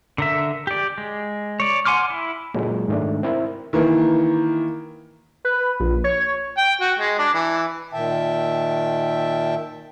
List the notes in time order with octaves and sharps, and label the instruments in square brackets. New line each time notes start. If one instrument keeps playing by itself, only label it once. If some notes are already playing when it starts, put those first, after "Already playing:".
[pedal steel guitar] D3 A#4 E5
G4 D5
G#3
C#5 D5
F#5 G#5 C6 D6 F6
E4
[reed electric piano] A#2 F#3 G#3
G#2 D#3 A3 D4
C4 E4 A#4
[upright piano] D#3 E3 A#3
[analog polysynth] B4
A#1
C#5
[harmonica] G5
F#4
G#3
D4
E3
[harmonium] A#2 D#3 E5 G5 A5